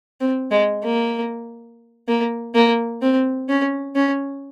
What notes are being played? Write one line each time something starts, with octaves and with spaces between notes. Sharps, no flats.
C4
G#3
A#3
A#3
A#3
C4
C#4
C#4